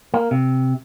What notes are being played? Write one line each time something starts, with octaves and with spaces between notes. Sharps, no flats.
A#3
C3